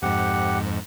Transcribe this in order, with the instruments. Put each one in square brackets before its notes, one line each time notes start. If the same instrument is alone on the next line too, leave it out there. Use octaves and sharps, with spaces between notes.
[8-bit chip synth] F2 G#2 [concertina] G4 F#5